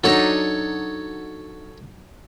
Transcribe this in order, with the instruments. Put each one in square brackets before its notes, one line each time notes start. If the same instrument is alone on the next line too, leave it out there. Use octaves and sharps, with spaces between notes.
[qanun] F#3 D4 D#4 [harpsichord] A4 C#5